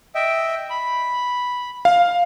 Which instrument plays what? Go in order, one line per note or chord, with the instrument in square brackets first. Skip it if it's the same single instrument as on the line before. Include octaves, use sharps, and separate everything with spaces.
[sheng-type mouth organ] D#5 E5 G5
B5
[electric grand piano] F5